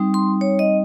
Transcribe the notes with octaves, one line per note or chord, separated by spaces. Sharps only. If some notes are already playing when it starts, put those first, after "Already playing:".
Already playing: G3 C4 D#4
C6
C#5
D#5